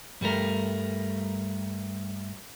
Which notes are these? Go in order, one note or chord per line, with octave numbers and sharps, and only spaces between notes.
G2 G3 A3 A#4